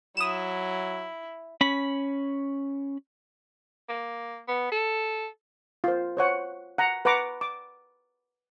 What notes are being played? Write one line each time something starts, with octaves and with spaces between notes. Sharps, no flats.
F#3 E4 D#6 E7
C#4 B5
A#3
B3
A4
F4 C5
C5 C#5 F#5
F#5 A#5
B4 F#5 A#5 D6
D6